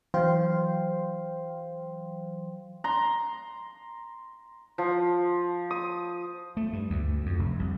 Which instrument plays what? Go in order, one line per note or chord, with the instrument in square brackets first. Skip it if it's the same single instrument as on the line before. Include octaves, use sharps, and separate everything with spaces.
[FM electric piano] E3 F#3 C5 F5 G5 C6
[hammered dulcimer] A#5 C6
[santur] F3
D#6
[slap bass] A3
G2
D2
F2
F1
C2